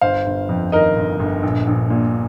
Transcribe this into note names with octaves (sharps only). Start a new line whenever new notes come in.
G1 C5 F5
G1
F2
D#3 A#4 D#5
G1
G1
A#1
A#1
A#2